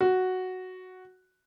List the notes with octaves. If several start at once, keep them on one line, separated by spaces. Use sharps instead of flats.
F#4